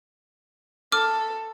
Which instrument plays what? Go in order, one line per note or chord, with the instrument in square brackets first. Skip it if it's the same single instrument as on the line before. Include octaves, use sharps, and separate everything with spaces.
[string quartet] A4 [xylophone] D6 F6